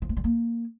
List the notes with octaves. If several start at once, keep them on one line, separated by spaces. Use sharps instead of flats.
F3
A3
G3
A#3